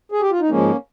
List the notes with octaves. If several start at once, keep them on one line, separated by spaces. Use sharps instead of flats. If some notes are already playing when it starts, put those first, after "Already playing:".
G#4
G4
F4
D#4
G#2 F3 G#3 A#3 C#4